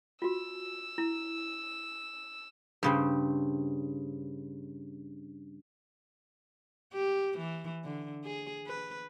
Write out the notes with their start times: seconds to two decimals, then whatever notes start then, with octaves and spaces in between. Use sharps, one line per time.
0.22 F4 F#4 E6
0.98 E4
2.83 G2 C#3 C4
6.93 G4
7.38 E3
7.85 D3
8.25 G#4
8.67 B4